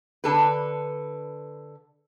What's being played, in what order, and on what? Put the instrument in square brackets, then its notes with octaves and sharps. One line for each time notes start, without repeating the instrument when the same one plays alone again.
[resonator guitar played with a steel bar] D3 A4 B4